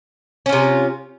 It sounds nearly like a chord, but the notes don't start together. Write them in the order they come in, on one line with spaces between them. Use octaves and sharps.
C#4 F4 C3